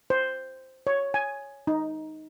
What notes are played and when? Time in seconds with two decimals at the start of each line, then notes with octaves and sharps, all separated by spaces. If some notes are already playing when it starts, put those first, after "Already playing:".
0.10 C5
0.87 C#5
1.14 G#5
1.67 D#4